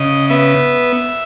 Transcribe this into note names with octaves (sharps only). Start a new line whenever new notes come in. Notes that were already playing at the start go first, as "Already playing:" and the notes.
Already playing: C#3 D#5
B3 E5